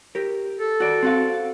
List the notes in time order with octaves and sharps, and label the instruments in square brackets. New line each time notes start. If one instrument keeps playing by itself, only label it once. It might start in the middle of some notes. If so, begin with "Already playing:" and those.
[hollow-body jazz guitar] G4 A#4
[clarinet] A4
[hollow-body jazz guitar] F#4 D5
C4 F#4 F5